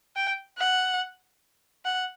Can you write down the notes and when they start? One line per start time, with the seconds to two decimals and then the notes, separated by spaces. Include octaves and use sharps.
0.16 G5
0.58 F#5
1.85 F#5